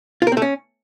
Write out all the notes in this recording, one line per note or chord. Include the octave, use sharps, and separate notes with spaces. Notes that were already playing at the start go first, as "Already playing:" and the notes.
F4
A#4
C4
A3
C#4